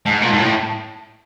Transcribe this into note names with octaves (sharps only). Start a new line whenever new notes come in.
G#2 A5
A#2
G#2
A2